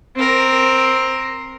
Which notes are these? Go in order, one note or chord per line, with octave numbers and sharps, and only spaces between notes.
C4 A#4